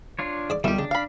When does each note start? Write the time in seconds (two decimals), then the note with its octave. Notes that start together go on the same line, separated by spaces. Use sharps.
0.19 D4 F4 C#5
0.50 G#2 D5 D6
0.64 B1 A#2 D#3 G3 E4 G4
0.79 C#3 D4
0.91 F5 B5